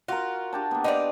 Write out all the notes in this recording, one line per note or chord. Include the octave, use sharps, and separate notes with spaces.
F4 F#4 A#4
D4 G4 A5
A#3 B3
D#4 F4 B4 D5 G5